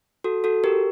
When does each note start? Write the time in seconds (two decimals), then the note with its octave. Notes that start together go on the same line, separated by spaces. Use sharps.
0.24 F#4 A4
0.44 F#4 A4
0.64 G4 A#4